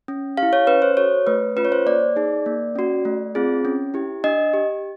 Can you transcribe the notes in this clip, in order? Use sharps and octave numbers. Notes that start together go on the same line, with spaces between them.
C#4
G4 F5
E4
C#5
C#4 B4
C5
F#4 A4 C#5
A3 B4
C#4 F4 B4
C#5
C5
A#3 D5
D#4 G#4
A#3
C#4 F#4
A3
C4 F4 G#4
C#4
E4 G4
D4 D#5
G4